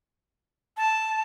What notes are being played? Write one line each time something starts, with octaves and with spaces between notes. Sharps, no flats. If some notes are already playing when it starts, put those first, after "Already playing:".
A5